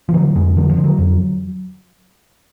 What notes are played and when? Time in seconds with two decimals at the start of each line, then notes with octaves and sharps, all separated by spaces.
0.09 F3
0.14 D3 F#3
0.35 F2 G#3
0.57 D3 F#3
0.69 F3
0.77 D3
0.84 F#3
0.98 F2